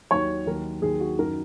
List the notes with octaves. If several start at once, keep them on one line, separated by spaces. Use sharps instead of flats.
D#2 D#3 F#3 C#5
D#2 D#3 F#3 A#4
D#2 D#3 F#3 G#4
F#4
F#2 D#3 F#3 A#4